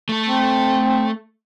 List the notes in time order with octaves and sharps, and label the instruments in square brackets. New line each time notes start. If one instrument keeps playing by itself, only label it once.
[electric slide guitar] A3 A4
[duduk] C4